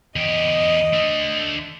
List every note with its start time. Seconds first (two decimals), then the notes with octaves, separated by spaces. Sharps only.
0.16 E2 G4 D#5
0.93 D3 A3